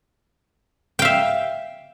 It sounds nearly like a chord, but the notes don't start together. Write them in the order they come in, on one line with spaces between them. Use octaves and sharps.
G5 F5 E5